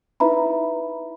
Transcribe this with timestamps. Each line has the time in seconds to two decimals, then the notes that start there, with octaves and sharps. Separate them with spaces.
0.20 D#4 E4 B4 E5 A#5 B5